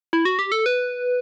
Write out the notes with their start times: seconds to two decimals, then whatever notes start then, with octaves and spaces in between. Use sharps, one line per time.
0.13 E4
0.25 F#4
0.39 G4
0.52 A4
0.66 B4